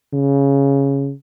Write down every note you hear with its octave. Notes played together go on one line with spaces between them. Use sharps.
C#3